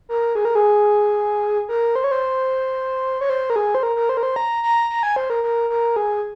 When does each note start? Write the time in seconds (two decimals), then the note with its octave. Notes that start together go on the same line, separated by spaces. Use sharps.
0.09 A#4
0.35 G#4
0.45 A#4
0.55 G#4
1.69 A#4
1.96 C5
2.04 C#5
2.12 C5
3.21 C#5
3.30 C5
3.50 A#4
3.56 G#4
3.75 C5
3.83 A#4
3.96 A#4
4.09 C5
4.17 A#4
4.23 C5
4.36 A#5
4.63 A#5
4.90 A#5
5.03 G#5
5.16 C5
5.30 A#4
5.43 A#4
5.70 A#4
5.96 G#4